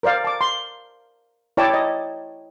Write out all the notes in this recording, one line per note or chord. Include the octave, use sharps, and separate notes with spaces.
A#4 C5 D5 F5
A5 D6
C6
E4 C#5 D5 G5 A5 D6
D#5